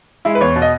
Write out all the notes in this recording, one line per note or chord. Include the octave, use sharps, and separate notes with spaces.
G#3 E4
B4
E2 C#5
B2
D#5